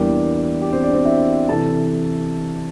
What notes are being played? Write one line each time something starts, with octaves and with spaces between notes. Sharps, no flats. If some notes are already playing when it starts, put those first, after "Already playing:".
Already playing: E2 E3 G3 A#3 D4 G4
G4
C4 C5
D4 D5
C4 C5
E4 E5
C3 E3 A4 A5